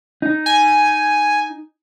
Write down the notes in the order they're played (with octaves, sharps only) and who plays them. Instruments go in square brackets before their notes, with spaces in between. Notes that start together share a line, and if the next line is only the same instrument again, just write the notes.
[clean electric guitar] D#4
[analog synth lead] G#5